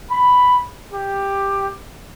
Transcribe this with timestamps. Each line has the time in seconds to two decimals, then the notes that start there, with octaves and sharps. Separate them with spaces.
0.11 B5
0.91 G4